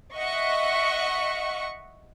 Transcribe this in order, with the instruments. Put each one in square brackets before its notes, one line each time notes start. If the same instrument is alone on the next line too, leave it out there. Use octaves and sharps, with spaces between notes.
[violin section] D#5 E5 F#5 C#6